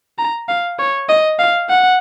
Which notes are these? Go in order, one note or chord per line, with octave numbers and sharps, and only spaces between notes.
A#5
F5
C#5
D#5
F5
F#5